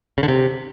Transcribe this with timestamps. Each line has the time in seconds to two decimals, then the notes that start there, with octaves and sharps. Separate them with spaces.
0.18 C#3
0.23 D3
0.28 C3